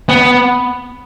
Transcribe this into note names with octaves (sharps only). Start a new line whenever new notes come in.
B3